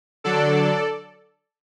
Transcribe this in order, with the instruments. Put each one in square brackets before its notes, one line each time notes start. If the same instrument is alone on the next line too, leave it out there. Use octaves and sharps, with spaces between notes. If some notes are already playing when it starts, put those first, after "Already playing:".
[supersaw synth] D3 F#3 D4 A4 D5